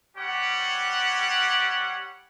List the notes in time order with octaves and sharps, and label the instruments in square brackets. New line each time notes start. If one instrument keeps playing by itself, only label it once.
[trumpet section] G3 G4 C#5 F#5